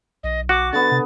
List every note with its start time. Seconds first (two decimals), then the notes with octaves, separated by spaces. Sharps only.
0.23 B1 D#5
0.49 F#4 F#5 D6
0.73 D3 B3 A6
0.91 C3